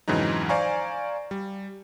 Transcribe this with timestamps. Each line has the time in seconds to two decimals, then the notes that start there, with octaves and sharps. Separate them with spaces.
0.08 F2 G#2 C#3 E3 F#3 D#4
0.49 C5 D5 F5 G#5 A#5 C#6
1.31 G3